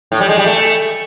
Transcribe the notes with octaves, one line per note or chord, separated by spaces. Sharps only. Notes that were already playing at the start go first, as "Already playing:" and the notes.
A2
G3
G#3
G3
A3